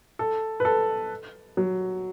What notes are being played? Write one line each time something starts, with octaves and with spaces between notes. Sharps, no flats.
A4
B4
A4
F#3